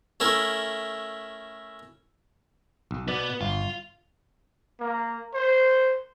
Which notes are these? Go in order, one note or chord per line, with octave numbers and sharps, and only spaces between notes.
A3 C#4 E4 A#4
B1
B2 B3 D5
G1 F4
A#3
C5